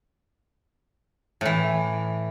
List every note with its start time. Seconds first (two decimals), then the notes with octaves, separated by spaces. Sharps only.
1.41 A2 E3